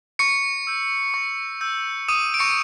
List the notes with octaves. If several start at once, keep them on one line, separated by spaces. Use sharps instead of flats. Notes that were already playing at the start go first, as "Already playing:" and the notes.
C#6 C#7
E6 G6
C#6
E6 G6
D6 D#6 D#7
D7
C#6 C#7